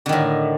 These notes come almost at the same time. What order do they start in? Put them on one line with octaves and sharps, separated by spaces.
D3 D#3 A2